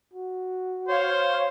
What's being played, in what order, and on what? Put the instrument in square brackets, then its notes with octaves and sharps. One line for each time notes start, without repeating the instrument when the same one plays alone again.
[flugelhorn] F#4
[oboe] C5 [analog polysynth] C#5 F5